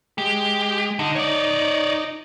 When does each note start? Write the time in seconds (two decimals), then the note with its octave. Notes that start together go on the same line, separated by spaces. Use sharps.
0.18 G#3 G4
0.99 D3 D#4
1.15 C#5 D5